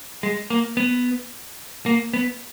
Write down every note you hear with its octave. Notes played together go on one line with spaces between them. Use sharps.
G#3
A#3
B3
A#3
B3